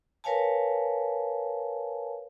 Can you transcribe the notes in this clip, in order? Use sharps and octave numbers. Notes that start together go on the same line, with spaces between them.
A#4 B4 C#5 F5 G#5 A5